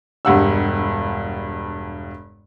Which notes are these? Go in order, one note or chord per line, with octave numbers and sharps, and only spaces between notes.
E1 G2 F#5 E6